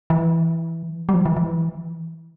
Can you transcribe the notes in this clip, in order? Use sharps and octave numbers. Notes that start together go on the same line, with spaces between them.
E3
G3
F3
E3
E3